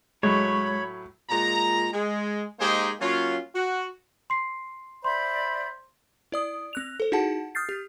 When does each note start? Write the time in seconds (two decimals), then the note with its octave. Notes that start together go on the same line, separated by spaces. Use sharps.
0.23 A2 F#3 G#3 C#5 B5
1.30 A#2 G#3 A#5
1.93 G#3
2.60 G#3 A#3 D#4 G4 G#4 C5
3.01 F#3 A#3 C#4 F4
3.55 F#4
4.30 C6 C7
5.04 C5 D5 E5 B5 C6
6.32 E4 D5 D#6
6.73 C4 F#6 F7
7.00 A4 C5
7.12 D#4 E4 F#4 G#4 F#5 A5
7.55 D#6 F6 G6 A6 C7
7.69 G4